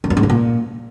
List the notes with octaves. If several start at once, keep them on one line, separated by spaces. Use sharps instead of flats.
D#3
F#2
G#2
C#3
A#2